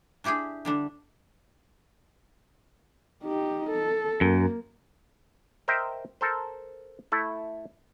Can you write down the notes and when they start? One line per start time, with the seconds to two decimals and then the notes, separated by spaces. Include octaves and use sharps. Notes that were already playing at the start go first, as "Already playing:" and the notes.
0.24 D4 E4 G4 G#4 G5
0.65 D3 G3 D4
3.23 D#4 G4
3.70 A4
4.21 F#2 A#3
5.68 A#4 C5 D#5 E5 G5
6.21 A4 A#4 C5
7.12 A3 E4 A4